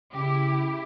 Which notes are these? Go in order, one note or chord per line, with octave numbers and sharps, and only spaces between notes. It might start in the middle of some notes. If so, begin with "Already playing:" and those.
C#3 E4 G4